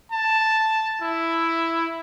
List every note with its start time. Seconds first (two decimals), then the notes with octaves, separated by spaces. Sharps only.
0.12 A5
1.02 E4